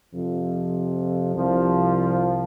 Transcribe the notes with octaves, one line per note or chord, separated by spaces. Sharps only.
F2 C3 F3
C2 C3 F3